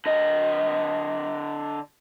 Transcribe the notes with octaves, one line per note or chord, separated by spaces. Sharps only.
D3 D#5